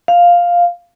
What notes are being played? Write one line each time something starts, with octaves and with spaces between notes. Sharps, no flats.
F5